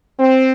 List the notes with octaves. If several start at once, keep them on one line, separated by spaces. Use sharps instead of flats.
C4